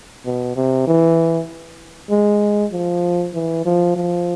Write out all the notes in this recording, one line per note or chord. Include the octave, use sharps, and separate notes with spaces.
B2
C3
E3
G#3
F3
E3
F3
F3